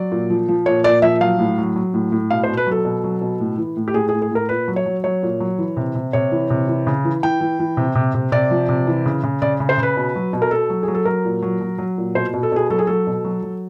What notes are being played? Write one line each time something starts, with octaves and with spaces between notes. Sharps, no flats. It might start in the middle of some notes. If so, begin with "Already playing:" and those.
Already playing: F#3 D5
A#2
F3
F3
A#2 C#5
A#2 D5
F3 E5
F#3 F5
A2
F#3
F#3
A2
A2
B2 F5
C5
B2
B4
F#3 A4
B2
F#3
B2
A2
E3
A2
G4
A2 G#4
G#4
A2
G#4
A2 A#4
A#2 B4
F#3
C#5
F#3
F#3 C#5
A#2
F#3
E3
C3
C3
C3 C#5
E3
C3
E3
C#3
E3
E3 G5
E3
E3
C3
C3
C3
C3 D5
F3
C3
E3
C#3
C#3
C#3 D5
C#3
C5
C#3 B4
B2
F#3
B2
A#4
B2 A4
F#3
F#3 G#4
A4
F#3 A#4
A#2
F#3
F#3
F#3
A#2
B2 C5
B2
A4
B2 G#4
F#3 A4
G#4
F#3 A4
B2
F#3
F#3